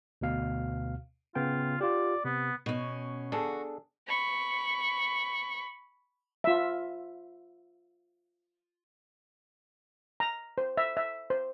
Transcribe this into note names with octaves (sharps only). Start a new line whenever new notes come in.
D2 B2 F5
C#3 B3 F4 G5
F4 G4 D5
C3 B3
B2 C#4
D4 F#4 G#4 A4
B5 C#6
F4 E5
A#5
C5
E5
E5
C5